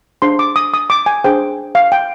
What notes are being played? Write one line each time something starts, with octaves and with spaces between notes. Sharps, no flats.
D4 G#4 C5 C6
D6
D#6
D#6
D6
G#5
D4 G#4 C5 G5
F5
G5